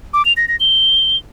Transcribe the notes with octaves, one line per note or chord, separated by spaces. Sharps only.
D6
F7
A#6
A#6
G7